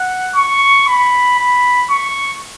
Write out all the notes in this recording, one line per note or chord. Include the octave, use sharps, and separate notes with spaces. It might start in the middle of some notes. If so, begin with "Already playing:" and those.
Already playing: F#5
C#6
B5
B5
C#6